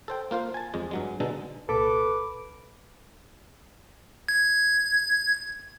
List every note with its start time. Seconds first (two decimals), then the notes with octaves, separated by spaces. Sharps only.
0.08 A4 C5 G5
0.31 A#3 F4 C5 F5
0.54 G#5 A5
0.74 F2 G#3
0.91 G2 F#3 G#3
1.20 B2 D3 G#3 D#4 A4
1.69 C2 A#2 A4 B4 B5 D6
4.28 G#6